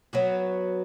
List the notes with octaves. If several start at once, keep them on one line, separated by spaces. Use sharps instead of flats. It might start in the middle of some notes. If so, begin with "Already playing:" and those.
F#3 B3 F#4